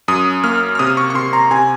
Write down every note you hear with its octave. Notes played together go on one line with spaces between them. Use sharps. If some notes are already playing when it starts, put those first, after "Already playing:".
F#2 D#6
A#3 F6
F6
C3 D#6
C#6
C#6
C3 C6
A#5
C3 G#5